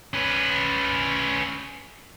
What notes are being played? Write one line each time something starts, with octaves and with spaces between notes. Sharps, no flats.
C#4 B4